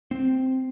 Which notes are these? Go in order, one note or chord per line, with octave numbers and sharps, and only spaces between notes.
C4